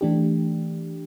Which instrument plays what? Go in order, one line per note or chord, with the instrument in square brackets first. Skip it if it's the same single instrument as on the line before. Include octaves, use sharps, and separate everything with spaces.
[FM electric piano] E3 A3 D4 G4